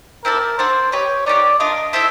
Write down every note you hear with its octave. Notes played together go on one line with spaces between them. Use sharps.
C4 E4 A4 A#4 D5
D4 F#4 A4 C5 D5
G4 B4 C#5 D#5
B3 D#4 G4 A#4 D5
A3 D4 F4 A#4 D#5
E4 A4 C5 E5